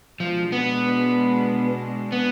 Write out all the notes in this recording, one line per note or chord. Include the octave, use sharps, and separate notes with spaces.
B2 F3 G#3 D4
B3
B3